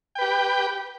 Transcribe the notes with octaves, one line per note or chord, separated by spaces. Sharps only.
G4 B4 G5